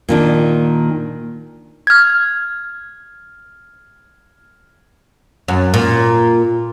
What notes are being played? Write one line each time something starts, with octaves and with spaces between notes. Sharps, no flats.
A#2 D#3 D4
F6 G#6
F#2
A#2